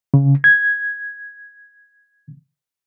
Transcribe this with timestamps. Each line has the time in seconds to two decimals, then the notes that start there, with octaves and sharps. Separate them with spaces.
0.14 C#3
0.44 G#6